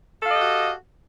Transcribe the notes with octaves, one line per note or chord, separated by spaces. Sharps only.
F#4 G4 A4 D#5 F5